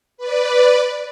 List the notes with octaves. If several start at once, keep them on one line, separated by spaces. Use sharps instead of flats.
B4 D5